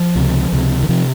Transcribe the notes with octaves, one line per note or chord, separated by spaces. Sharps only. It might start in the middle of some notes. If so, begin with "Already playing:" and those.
Already playing: F3
C#2 C3
C#2 C3
D#3
C3 F3